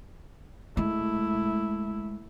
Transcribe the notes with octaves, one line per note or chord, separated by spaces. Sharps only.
G#3 A3 E4